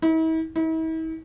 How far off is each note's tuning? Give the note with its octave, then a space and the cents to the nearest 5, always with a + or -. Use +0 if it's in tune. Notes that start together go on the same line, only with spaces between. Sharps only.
E4 -45
E4 -45